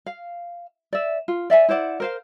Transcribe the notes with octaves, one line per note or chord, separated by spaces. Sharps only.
F5
D5 E5
F4
D5 E5 F5 G#5
E4 C5 D5 F#5
A#4 C5 F5